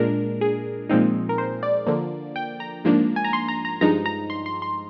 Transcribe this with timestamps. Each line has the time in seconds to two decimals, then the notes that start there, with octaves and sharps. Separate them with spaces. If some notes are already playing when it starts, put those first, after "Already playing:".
Already playing: A#2 G#3 D4 A#4
0.41 G#4
0.90 A#2 F3 G#3 C4 D#4
1.29 A#4
1.38 C5
1.63 D5
1.87 D3 F3 A#3
2.36 G5
2.60 A#5
2.84 G#2 F3 A#3 D4
3.16 G#5
3.25 A#5
3.33 C6
3.48 A#5
3.65 A#5
3.81 G2 F3 G#3 D#4 A#5
4.06 A#5
4.30 C6
4.46 C6
4.62 C6